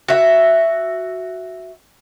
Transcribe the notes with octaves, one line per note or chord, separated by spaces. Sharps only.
F#4 E5